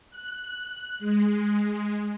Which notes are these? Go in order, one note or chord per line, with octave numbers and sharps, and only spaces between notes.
F#6
G#3